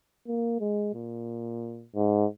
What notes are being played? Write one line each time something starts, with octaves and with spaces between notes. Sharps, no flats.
A#3
G#3
A#2
G#2